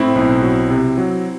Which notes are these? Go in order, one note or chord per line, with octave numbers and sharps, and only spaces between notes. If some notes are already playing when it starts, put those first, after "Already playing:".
Already playing: A2 C4 E4
B1
F#3
C3
F#3